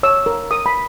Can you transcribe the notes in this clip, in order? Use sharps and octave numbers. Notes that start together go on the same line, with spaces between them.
C#5 E6
A#4
A#4 D#6
B5